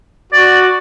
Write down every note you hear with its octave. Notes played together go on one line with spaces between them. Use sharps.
F#4 D5